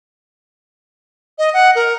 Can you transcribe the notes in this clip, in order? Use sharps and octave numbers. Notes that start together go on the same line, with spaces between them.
D#5
F#5
A#4